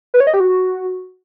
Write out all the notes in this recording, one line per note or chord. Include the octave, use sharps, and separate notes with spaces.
B4
C#5
D#5
G4
F#4